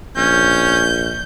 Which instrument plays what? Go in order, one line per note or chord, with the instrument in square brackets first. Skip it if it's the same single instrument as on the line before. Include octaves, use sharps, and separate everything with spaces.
[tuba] A#1 [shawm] C#4 [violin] G6